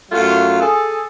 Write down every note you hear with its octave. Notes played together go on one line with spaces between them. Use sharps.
F#2 F#3 A3 F4
G#4 A4